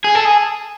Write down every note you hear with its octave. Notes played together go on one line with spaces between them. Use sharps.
G#4
A4
G#4